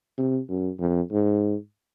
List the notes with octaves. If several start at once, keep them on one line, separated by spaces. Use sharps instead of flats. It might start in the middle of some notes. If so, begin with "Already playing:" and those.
C3
F#2
F2
G#2